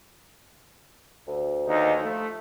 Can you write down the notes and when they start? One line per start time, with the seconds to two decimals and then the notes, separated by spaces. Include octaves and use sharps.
1.27 D2
1.66 D#2 D#4
2.01 F3 A3